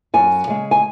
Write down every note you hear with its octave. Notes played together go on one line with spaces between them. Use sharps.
F#2 G#5
C#3 G#3
G#5